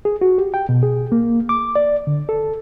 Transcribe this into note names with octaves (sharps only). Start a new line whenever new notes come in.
G#4
F#4
G4
G5
B2
G#4
A#3
D6
D5
D3
A4